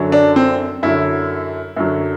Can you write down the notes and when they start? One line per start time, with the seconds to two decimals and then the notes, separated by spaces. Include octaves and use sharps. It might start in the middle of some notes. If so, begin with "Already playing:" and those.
Already playing: F#2 D3 F#3
0.12 D4
0.36 C4
0.83 F#2 D3 F#3 E4
1.76 F#2 D3 F#3